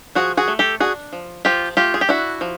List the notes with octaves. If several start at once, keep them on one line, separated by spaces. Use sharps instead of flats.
F3 F#4 G#4
F#4 G#4
A3
G4 A4
D4 F#4 G#4
F3
F3 F4 G4
A3 F4 G4
G#4
G4
D4 E4 F#4
F3